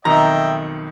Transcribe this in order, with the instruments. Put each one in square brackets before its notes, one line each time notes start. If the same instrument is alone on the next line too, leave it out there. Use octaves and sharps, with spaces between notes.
[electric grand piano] B1 F2 D#3 [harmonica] D#5 E5 G5 [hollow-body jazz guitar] A#5